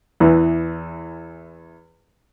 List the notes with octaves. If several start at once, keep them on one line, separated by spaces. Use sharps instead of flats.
E2 E3